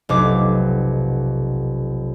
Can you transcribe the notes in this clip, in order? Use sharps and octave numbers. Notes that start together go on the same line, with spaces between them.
F1 B1 D6